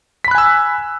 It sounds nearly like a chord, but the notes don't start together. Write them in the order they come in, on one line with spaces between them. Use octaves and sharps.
B6 B5 F#6 G#5 E6